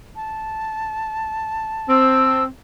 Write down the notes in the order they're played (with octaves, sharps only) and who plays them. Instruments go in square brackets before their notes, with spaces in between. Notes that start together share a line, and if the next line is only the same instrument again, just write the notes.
[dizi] A5
[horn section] C4 [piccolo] E6